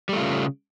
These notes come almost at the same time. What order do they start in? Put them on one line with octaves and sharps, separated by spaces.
G3 A3 F4 C#3